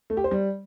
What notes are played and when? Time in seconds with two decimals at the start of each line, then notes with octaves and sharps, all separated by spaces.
0.10 A3
0.17 G4
0.24 C5
0.31 G3